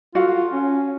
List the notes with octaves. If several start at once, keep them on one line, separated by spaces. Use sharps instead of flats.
F4 F#4 A4 F5
C#4